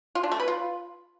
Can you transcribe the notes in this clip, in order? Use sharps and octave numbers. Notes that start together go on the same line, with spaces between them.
F4
D4
A3
B4
F4